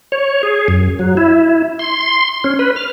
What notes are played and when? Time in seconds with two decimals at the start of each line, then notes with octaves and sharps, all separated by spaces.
0.12 C#5
0.43 G#4
0.68 F#2
0.99 F#3
1.17 E4
1.79 C6
2.44 C#4
2.59 B4
2.76 F6